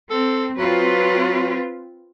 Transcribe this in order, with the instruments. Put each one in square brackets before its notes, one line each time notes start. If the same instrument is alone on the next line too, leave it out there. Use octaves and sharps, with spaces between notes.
[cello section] C4 [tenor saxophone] A4
[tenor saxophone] F#3 [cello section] C4 F4 B4